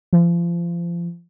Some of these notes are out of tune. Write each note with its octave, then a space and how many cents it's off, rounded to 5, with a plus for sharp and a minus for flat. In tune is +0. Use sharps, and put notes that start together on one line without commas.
F3 -30